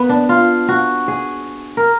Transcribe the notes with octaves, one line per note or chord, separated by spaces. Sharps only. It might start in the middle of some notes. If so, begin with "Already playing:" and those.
Already playing: B3
D4
F4
F#4
G#4
A#4